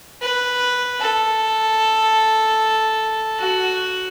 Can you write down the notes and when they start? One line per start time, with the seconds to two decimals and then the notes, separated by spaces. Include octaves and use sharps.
0.22 B4
1.00 A4
3.40 F#4